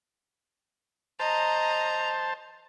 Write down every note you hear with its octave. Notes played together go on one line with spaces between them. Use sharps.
C5 D#5 A5 A#5